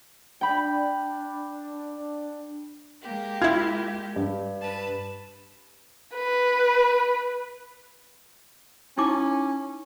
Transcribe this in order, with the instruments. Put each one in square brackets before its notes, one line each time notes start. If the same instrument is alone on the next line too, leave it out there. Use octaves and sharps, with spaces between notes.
[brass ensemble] D4 [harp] G5 B5
[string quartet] G#3 A#3 G4
[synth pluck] E4 F4 [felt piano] G#6
[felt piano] G2
[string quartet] B4 A5
[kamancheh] B4
[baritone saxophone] C#4 [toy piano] D#4 E4 D6